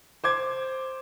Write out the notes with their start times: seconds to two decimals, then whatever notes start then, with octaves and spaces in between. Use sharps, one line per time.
0.24 C5 D6 G#6